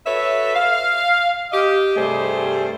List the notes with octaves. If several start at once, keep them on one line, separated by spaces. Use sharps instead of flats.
F#4 A4 B4 C#5 E5
F5
G4 D#5
G2 C3 G3 A3 G#4 C5